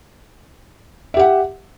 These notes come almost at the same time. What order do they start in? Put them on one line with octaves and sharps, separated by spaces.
E5 G4 F#5